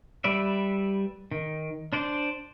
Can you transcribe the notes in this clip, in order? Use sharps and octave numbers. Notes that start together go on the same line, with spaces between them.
G3 B4 D5 E5
D#3
D4 C5 D5